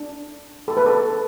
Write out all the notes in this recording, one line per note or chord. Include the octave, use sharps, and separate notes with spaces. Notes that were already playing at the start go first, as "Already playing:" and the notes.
Already playing: D4
A4
B4
A4